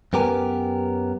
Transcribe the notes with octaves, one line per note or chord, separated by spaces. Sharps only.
F#2 B3 G4 A#4 B4 G#5